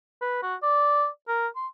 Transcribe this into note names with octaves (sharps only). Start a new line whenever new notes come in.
B4
F#4
D5
A#4
C6